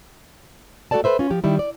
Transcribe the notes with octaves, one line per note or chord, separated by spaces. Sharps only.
A3 F#4 A4 C#5 D5 A5
A4 B4 C5 E5
C#4 F4
F3 G4
D#3 G3 E4
D5